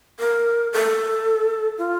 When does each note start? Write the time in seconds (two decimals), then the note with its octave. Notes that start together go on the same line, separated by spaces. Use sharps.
0.19 A#4
0.73 A4
1.78 F4